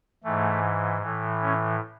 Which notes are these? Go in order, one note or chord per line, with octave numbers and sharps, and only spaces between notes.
G#2 E3 A3
A2 E3
C#4